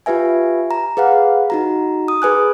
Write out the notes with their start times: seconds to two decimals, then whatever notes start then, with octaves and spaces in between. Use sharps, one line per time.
0.06 F4 G4 B4 E5 G#5
0.71 A#5
0.97 G#4 B4 F5 F#5
1.50 D#4 F#4 A#5
2.08 D#6
2.22 G#4 B4 G#5 F#6